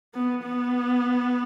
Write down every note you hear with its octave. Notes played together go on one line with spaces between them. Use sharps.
B3
B3